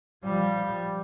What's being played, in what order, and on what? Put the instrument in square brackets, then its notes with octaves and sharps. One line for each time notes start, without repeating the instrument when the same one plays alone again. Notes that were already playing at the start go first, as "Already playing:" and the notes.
[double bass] F3 G3